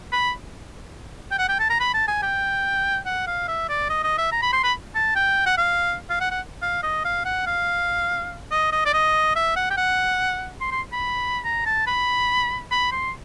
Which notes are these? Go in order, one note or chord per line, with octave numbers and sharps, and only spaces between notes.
B5
G5
F#5
G5
A5
A#5
B5
A5
G#5
G5
F#5
F5
E5
D5
D#5
D#5
E5
A#5
B5
C6
B5
A5
G5
F#5
F5
F5
F#5
F#5
F5
D#5
F5
F#5
F5
D#5
D#5
D5
D#5
E5
F#5
G5
F#5
C6
C6
B5
A#5
A5
B5
B5
C6